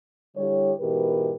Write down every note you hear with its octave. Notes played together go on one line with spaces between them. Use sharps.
D3 G3 E4 G4 C#5
G#2 B2 E3 G4 A#4 B4